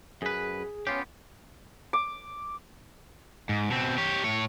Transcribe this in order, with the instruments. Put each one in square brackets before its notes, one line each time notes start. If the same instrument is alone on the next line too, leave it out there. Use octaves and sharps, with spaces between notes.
[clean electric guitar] F#2 B4 [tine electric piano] G#4
[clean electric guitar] B3 F4 G4 [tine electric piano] C#4
[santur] D6
[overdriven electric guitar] G#2
B2 C4
G4 C#5
A2 C#5